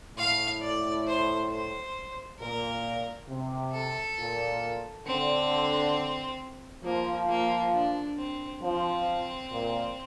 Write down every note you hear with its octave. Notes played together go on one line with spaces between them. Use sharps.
A2 F5
D5
C5
C5
A#2 A#4
C3
A4
A#2
D3 C4
F3 A#3
A#3
D4
C4
F3 C4
A#2